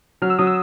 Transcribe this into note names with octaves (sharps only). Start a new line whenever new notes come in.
F#3 F6
E6
F#3 D#6
E6